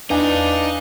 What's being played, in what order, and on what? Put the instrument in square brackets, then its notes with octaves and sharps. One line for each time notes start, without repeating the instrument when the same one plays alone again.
[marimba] E2 [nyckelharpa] D4 [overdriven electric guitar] D#4 [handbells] B4 F5 G#5